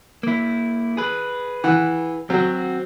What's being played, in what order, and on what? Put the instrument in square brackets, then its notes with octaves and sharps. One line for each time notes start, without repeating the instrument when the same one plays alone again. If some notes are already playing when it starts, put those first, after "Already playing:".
[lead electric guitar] A#3 E4
G#4 B4
[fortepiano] E3 F#5
[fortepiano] F#3 [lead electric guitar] C4 F#4